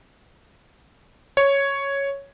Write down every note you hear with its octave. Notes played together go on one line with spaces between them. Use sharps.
C#5